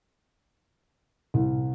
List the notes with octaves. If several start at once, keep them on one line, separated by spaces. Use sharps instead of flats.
C2